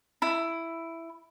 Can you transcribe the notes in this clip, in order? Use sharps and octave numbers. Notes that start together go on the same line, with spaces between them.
E4 B5